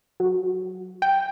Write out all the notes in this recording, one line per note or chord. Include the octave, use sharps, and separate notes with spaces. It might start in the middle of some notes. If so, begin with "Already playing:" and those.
F#3
G5